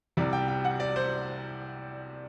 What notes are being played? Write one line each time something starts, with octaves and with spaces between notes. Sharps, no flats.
C2 C3 G3 D5
G5
G5
F#5
D5
C5